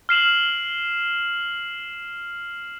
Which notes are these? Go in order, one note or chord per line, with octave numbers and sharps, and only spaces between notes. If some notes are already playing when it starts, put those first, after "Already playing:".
F6 C7 E7 F#7